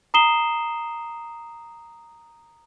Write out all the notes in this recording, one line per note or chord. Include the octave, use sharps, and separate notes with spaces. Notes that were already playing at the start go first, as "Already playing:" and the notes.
A#5 D#6 C7 E7 G7